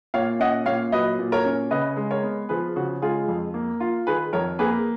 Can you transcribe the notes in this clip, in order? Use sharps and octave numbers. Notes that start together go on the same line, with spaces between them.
A#2 C#5 F5
C#4 D#5 F#5
A#2 C#5 F5
F#3 B4 D#5
A#2
A#4 C#5
C#4
C#3 B4 D#5
G#3
A#4 C#5
B3
F3 G#4 B4
C#3 F#4
G#3 F4 G#4
F2
A#3
F4
D#3 G#4 B4
F2 A#4 C#5
A#3 G#4 B4